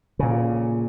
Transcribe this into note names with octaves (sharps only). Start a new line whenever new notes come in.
A#2 C#3